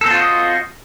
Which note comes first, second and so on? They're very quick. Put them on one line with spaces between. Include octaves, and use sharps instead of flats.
A4 C4 F4 F#4 D#5